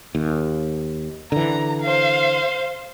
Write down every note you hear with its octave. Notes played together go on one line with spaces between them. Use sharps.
D#2
D3 E3 A#5
C5 F5